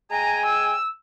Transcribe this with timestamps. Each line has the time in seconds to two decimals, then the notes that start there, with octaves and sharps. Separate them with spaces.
0.11 G#3 G5 G#5 A#5
0.46 E6